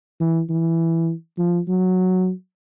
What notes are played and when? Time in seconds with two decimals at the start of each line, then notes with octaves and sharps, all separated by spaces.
0.20 E3
0.49 E3
1.38 F3
1.68 F#3